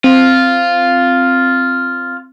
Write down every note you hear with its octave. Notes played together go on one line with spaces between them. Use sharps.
C4 F4